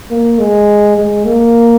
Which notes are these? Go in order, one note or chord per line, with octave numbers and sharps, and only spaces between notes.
A#3
G#3
G#3
A#3